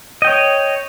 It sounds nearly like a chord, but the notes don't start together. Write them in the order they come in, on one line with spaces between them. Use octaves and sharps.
D#5 G5 C#5